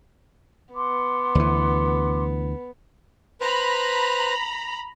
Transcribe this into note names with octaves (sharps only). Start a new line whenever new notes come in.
B3 F#5 C6 D6
D2 E3
B4 C5 A#5 B5